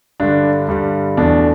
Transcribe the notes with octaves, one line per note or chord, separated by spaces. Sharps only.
G2 D3 G3 D4
G2 D3 G3
E2 B2 A3 D4